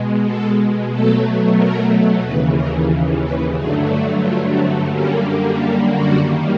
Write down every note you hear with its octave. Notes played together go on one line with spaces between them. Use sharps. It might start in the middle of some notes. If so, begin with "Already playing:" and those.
Already playing: B2 G#3
A4
B2 F#3 A3 A4
A#4
D#2 C#3 E3 B4
A#4
B4
G2 D3 F#3 A3 G#4
F#4
F4
C4
F#2 D3 G3 A#3 C#4
G4
F#4
F#2 D#3 G3 A#3